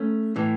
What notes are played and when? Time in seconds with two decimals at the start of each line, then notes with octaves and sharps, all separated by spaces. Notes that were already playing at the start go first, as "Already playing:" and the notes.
Already playing: A3 C#4
0.36 A2 E3